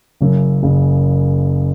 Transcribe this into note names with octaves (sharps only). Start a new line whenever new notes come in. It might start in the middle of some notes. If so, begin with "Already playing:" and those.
F#1 F#2 C#3
F#1 F#2 C#3